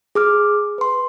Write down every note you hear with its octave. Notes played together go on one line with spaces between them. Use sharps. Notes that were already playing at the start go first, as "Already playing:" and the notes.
G#4 D6 F6
B4 C6